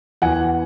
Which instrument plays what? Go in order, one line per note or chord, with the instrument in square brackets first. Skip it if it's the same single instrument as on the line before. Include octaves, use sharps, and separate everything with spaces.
[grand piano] E2 F#5 G#5